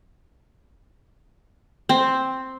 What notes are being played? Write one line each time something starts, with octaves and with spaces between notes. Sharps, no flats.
C4